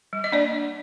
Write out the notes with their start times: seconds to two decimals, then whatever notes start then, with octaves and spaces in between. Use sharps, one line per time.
0.13 G3
0.24 D#5
0.32 A#3 D4 D5
0.53 D4